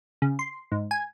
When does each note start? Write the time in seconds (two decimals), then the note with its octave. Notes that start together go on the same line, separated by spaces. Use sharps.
0.22 C#3
0.39 C6
0.72 G#2
0.91 G#5